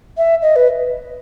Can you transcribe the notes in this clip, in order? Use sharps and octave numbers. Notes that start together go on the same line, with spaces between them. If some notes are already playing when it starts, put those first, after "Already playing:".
E5
D#5
B4